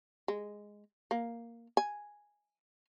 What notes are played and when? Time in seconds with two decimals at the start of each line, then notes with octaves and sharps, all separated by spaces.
0.28 G#3
1.11 A#3
1.77 G#5